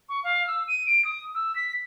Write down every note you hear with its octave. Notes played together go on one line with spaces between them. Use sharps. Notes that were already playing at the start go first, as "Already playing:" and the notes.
C#6
F5
E6
D#7
D7
D#6
E6
B6